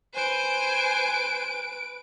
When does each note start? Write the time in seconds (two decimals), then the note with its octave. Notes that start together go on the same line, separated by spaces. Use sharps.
0.14 B4 C5 G#5 D7